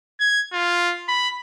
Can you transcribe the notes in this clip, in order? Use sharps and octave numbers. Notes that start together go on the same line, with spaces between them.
G#6
F4
B5